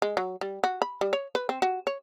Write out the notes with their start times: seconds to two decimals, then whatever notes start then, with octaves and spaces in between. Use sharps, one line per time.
0.02 G#3
0.17 F#3
0.41 G3
0.64 F#4
0.82 B5
1.01 G3
1.13 C#5
1.35 B4
1.49 C4
1.62 F#4
1.87 C#5